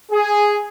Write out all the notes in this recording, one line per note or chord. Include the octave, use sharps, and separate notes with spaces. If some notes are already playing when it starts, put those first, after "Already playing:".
G#4